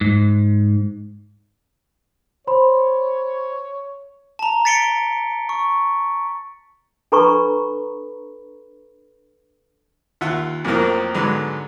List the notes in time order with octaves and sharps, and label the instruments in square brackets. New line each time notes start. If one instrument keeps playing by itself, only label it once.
[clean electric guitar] G#2
[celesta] C5 B5 C6 [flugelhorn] C#5
[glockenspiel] A5 A#5
A6 B6 C#7 D7 G7
C#6
[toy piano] D4 A4 B4 A#5 B5 C#6
[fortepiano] D#2 F4 E5 F#5
F2 A2 F3 F#3 A#3 C4
G#2 D3 F#3 G#3 B3 B5